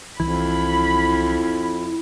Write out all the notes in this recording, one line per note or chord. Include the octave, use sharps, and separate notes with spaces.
C2 F2 E3 E4 B5